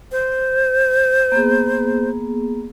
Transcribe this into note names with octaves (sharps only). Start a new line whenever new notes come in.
C5
A#3 B3 G#4